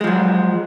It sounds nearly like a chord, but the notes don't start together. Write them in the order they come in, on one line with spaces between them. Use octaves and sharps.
G#3 F3 F#3